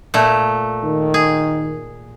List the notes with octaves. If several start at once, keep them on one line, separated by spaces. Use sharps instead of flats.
A#2 A3
D#3
G#4